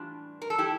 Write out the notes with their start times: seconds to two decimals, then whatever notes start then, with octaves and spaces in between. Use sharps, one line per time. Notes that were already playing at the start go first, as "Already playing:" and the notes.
Already playing: A2 E3 G3 D4 F4
0.42 A#4
0.50 A4
0.58 E4 G4